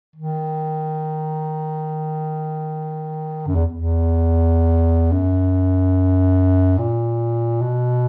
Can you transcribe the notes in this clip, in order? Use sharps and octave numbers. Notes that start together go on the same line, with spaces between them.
D#3
F#2
E2
E2
F#2
A#2
B2